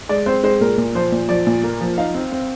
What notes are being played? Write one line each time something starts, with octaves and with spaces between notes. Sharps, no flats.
G#3 D5
C4 C5
G#3 C5
A#2 A#4
A#2
F3 C5
A#2
F3 D5
A#2
A#3
F3
D#4 F5
C4
C4